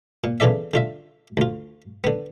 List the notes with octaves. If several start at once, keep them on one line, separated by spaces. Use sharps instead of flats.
A#2
E2 C#3 E3 A4 D5 E5
D3 F4 E5
D2 F4
D3 B3